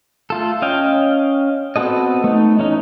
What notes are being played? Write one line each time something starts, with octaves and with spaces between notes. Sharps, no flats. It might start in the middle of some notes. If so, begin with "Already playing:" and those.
A3 F4 A4
C#4 D#5 F5 G5
B3 C4 F#4 A4 D#5
A3 D#4
E3 C#4 D#4